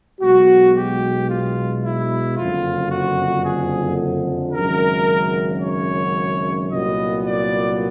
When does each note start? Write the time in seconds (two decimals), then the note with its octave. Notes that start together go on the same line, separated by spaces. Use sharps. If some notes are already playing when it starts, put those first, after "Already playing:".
0.20 B1 B2 G#3 F#4
0.74 G4
1.29 F4
1.83 E4
2.36 F#1 F2 D3 F3 F4
2.90 F#4
3.44 G#4
4.53 G#1 F#2 C#3 A#4
5.61 C#5
6.69 C2 A#2 F#3 B3 D#5
7.23 D5